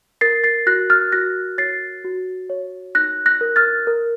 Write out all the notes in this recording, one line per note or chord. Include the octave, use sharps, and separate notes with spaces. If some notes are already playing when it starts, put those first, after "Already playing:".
A#4 A6 C7
A6 C7
F#4 F#6 A#6
F6 A6
F#4 F#6 A#6
C#5 A6 C7
F#4
C#5
D#4 F#6 A#6
F#6 A#6
A#4
F6 A6
A#4